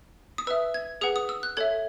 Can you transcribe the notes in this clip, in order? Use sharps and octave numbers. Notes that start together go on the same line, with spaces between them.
D#6
B4 E5 E6
G#6
G#4 B4 F#5 D#6
D#6
E6
F#6
A4 C#5 E5 G#6